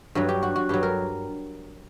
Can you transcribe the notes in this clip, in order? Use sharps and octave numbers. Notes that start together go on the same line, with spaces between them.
G2 F#3 F#4
G4
F#4
F#4
G2 F#3 G4
A#4